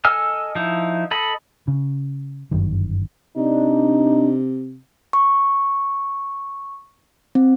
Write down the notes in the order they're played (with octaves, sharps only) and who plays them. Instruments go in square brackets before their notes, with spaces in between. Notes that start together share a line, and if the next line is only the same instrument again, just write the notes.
[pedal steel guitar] A4 D#5 G#5 E6 F6
F3 D#4 E4
A4 D#5 B5
[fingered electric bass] C#3
G1 F#2 D#3
[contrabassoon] C3 [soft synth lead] D4 [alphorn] D#4
[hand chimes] C#6
C4